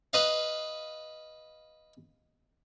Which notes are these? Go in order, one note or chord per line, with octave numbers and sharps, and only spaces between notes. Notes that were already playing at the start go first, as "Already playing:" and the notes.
B4 D#5 F5